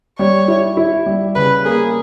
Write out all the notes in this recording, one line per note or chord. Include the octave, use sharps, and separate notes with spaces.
G3 C#5
E4
E4
G3
C#3 B4
A#3 G#4